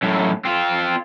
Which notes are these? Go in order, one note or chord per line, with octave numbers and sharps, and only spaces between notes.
F#2 A2
C4 F4